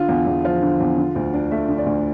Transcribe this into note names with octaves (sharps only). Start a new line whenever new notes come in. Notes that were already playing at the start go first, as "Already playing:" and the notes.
Already playing: D3 F4
E2
E2
F3 F4
D3
E2
D3
D2
D4
A3 E5
D3
D5
D2